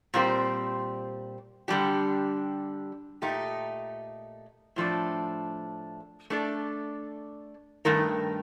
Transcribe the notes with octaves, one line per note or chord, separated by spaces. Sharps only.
A#2 G3 C4 G4 C5
D3 G3 D4 G4
A#2 A3 D#4 G4
A2 F3 A3 D4
A3 D4 A4 D5
G2 D#3 A3 D#4 A#4